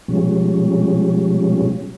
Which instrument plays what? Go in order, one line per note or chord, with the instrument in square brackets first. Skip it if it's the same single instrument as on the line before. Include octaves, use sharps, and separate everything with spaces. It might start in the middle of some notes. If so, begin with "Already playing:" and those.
[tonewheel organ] B2 F3 G3 G#3 C#4